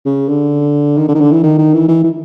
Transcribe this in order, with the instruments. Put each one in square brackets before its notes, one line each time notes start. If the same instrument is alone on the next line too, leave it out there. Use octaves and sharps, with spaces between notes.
[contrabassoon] C#3
D3
D#3
D3
D#3
D3
E3
D#3
D#3
E3
E3
E3